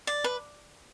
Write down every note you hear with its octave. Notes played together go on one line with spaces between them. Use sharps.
D5
B4